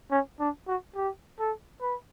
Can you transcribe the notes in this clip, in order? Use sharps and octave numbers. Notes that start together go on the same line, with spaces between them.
C#4
D4
F#4
G4
A4
B4